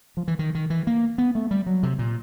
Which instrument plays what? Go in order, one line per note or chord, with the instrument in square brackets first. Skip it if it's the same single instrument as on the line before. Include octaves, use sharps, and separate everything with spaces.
[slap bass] F3
E3
D#3
D#3
E3
A#3
B3
A3
G3
F#3
C3
A#2